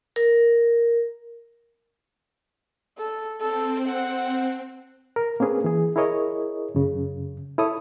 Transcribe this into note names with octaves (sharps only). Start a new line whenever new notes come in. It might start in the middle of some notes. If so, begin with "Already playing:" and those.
A#4
A4
C4 A4
F#5
A#4
A#3 C4 C#4 G#4 B4
E3 G#4
E4 G#4 A#4 C#5 D#5
F#2 C#3
E4 A4 C#5 D#6